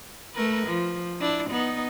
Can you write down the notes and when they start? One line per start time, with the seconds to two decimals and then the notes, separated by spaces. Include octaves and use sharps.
0.34 A3 A#4 B4
0.67 F3
1.20 D4 E4
1.50 B3 D#4